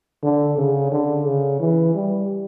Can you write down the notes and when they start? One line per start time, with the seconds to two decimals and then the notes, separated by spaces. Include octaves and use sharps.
0.23 D3
0.58 C#3
0.92 D3
1.26 C#3
1.60 E3
1.95 G3